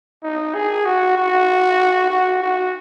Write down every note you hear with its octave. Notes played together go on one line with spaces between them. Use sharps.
D#4
G#4
F#4
F#4
F#4
F#4